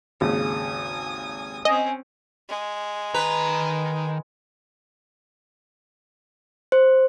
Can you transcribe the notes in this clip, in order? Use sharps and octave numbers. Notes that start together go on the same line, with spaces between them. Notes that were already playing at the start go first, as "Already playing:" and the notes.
G#1 D#2 C#3 G#5 D#6
C4 C#4 D#5 G#5
G#3
D#3 B4 A#5
C5